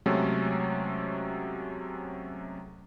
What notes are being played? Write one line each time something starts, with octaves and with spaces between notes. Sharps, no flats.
C3 F#3 G#3 A3 C#4